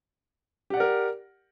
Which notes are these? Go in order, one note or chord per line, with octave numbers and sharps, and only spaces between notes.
G4 A#4 D5 F#5